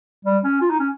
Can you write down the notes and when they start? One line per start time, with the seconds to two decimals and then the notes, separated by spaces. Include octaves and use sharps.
0.25 G3
0.44 C#4
0.61 F4
0.70 D#4
0.79 C#4